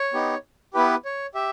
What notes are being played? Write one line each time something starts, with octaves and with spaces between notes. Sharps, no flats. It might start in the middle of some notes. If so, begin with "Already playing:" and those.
Already playing: C#5
B3 D#4 G4
B3 E4 G4 B4
C#5
G4 E5